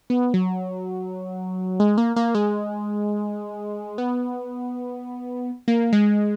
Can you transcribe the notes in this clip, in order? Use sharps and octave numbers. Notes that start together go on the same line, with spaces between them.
B3
F#3
G#3
A#3
A#3
G#3
B3
A#3
G#3